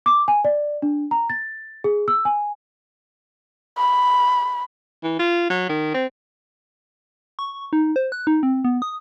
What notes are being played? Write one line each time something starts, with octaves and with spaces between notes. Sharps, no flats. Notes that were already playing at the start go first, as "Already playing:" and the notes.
D6
G#5
D5
D4
A#5
A6
G#4
E6
G#5
B5
E3
F4
F#3
D#3
C4
C#6
D#4
C5
F#6
D#4
C4
B3
D#6